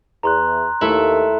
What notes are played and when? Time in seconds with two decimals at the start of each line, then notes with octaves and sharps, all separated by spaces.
0.23 E2 A#5 C6 F#6
0.81 D#2 A3 E4